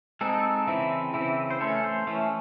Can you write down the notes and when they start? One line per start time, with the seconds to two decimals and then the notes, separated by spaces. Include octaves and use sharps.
0.21 G#3 C4 D#4 A4
0.67 C#3 E3 C4 E4
1.14 C#3 E3 C4 E4
1.50 C5
1.60 E3 A3 C#4 A4
1.84 C5
2.07 E3 A3 C#4